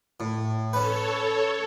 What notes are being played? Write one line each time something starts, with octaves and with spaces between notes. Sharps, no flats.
A2
C#4 A4 B4 C#5